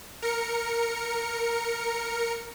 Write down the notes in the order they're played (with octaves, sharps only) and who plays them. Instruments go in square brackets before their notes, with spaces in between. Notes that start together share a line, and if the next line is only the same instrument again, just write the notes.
[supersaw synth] A#4 C#7